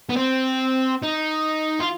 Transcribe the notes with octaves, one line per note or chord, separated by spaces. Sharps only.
B3
C4
D#4
F4